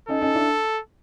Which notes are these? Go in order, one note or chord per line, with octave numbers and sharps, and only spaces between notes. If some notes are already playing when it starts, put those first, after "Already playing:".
C#4 D#4 A4
C#4 D#4
D4 E4